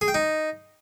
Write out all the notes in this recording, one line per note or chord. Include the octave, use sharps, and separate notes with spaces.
G#4
G5
D#4